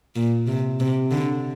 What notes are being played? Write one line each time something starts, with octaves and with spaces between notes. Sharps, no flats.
A#2
C3
C3
D3